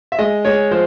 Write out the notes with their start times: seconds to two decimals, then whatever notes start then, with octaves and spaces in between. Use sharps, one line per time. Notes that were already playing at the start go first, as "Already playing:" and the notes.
0.12 E5
0.19 G#3 D#5
0.45 G#3 C#5
0.71 F3 C5